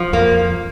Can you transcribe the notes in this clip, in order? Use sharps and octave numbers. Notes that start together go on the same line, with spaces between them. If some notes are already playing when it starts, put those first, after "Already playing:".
Already playing: F3
F2 A#3